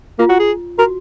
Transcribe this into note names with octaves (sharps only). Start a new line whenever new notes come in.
A#3 F4
F#4
G#4
F#4 A#4